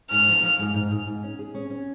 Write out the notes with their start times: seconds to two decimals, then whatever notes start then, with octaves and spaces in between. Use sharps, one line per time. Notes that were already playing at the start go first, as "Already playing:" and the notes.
0.11 G#2 F6
0.27 F3
0.43 F3
0.59 G#2
0.74 G#2
0.91 G#2
1.07 G#2
1.23 C#4
1.39 G#4
1.55 C#4
1.70 C#4